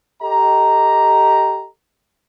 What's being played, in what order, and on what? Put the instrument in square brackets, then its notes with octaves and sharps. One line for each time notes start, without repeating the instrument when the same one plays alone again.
[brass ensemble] G4 A4 D#5 A#5